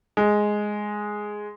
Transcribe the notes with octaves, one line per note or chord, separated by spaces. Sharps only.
G#3